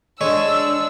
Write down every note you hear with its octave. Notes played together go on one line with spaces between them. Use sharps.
G#3 D4 C#5 E6